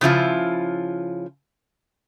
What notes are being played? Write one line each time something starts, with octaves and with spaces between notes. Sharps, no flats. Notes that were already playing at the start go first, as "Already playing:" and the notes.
C#3 F3 E4 F4